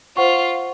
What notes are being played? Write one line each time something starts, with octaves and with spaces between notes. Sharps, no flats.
F4 C5 F#5 C#6